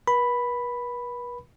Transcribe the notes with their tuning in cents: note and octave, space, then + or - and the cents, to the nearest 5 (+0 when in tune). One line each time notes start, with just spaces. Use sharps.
B4 -40 B5 +0